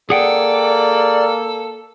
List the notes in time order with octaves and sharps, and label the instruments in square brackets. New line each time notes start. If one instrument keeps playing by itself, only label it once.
[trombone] A#3 [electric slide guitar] G#4 F#5 G5 [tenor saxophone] A4 [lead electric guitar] D5